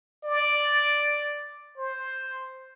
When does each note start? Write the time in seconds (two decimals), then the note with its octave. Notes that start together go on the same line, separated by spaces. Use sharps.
0.24 D5
1.78 C5